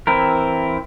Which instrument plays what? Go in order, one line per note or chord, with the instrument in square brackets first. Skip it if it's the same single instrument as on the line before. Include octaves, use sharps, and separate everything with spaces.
[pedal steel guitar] E3 C4 E4 A#4